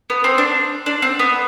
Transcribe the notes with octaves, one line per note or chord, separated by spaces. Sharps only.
B3
C4
D4
D4
C4
B3